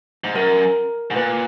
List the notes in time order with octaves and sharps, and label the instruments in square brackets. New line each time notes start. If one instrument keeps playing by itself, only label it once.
[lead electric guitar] G#2
[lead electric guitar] F#2 [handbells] A#4
[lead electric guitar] G#2
[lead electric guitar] A#2 [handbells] B4